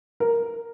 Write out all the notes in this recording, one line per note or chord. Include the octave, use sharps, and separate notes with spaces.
A#4